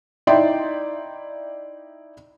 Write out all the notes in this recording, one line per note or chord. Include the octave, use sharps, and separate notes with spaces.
D#4 E4 D5 E5 G5 C6